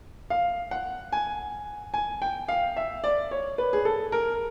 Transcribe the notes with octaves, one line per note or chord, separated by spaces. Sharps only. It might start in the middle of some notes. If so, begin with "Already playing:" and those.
F5
F#5
G#5
G#5
G5
F5
E5
D5
C#5
B4
G#4
A4
A#4